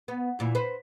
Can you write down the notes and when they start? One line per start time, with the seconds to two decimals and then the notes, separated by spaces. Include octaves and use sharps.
0.08 B3
0.39 D2 A#2 E3
0.55 B4 C5